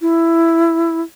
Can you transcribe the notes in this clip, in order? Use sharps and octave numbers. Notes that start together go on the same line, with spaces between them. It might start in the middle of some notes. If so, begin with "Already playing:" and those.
E4